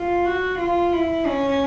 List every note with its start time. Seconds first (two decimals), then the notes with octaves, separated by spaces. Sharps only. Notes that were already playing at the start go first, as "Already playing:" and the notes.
Already playing: F4
0.26 F#4
0.59 F4
0.93 E4
1.26 C#4